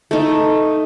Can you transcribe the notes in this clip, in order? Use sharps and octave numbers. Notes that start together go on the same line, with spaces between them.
A3 D#4